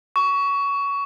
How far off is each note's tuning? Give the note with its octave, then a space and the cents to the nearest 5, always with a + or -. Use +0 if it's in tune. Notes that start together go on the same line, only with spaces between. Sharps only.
C#6 +20